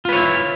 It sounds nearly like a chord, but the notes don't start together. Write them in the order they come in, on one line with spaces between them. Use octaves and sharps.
F4 B4 C#5 E4